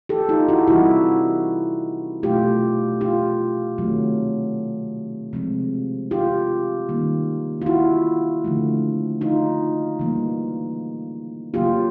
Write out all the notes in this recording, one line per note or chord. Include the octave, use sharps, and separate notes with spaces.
G4 A4
D#4 F4
E4 F#4
C3 E3 G3 E4 F#4
B2 F#3 A3 F4 G4
F4 G4
C3 D#3 F#3 A3
C3 F3 G#3
F4 G4
D#3 G3 A#3
F4
E4 F#4
D3 F3 A3
D#4 F4
C#3 E3 G3 A#3
C#3 F#3 A#3 F4 G4